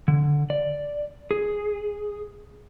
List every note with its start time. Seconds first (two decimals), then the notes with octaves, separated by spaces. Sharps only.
0.08 D3
0.50 D5
1.31 G#4